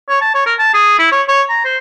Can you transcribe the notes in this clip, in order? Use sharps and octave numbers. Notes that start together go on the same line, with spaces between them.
C#5
A5
C#5
A#4
A5
G#4
E4
C#5
C#5
A#5
C5